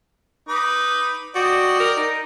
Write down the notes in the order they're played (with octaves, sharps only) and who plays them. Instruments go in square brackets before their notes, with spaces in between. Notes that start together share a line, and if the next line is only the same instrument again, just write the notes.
[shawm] D#4 [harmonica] B4 D6
[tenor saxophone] F#4 [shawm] D5 [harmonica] D#5 G5
[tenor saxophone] A#4
D#4